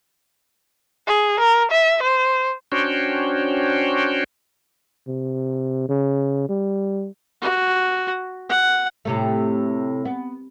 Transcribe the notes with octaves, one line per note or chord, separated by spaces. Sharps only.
G#4
A#4
E5
C5
C#4 D4 F#4 C5 C#5 G5
C3
C#3
G3
F#4
F#5
A2 C3 A3
B3